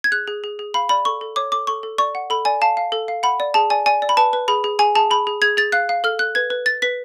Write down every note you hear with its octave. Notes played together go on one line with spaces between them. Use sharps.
G#6
G#4 F#6
G#4
G#4
G#4
F5 B5
D5 B5
A4 C#6
A4
C#5 D6
A4 D6
A4 C#6
A4
D5 C#6
F#5
A4 B5
D5 G#5
F5 A5
F5
A4
F5
F#5 B5
D5
G#4 A5
D5 G#5
D5 G#5
D5
B5
B4 A5
B4
G#4 B5
G#4
G#4 G#5
G#4 A5
G#4 B5
G#4
G#4 G#6
G#4 A6
F5 F#6
F5
A4 F6
A4 F#6
B4 G#6
B4
B4 A6
B4 B6